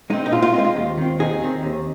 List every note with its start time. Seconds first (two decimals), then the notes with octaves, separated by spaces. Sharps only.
0.10 G#3 C4 D#4
0.26 D#4
0.32 A#2 F4
0.42 F4
0.53 C4 D#4
0.58 G#3
0.65 F4
0.76 D#2
0.97 D#3 C4
1.19 D#2 D#4 G#4
1.41 D#3 C4
1.63 D#2